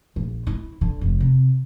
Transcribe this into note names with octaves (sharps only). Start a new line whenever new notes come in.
A#1
E4
D3
F1
C3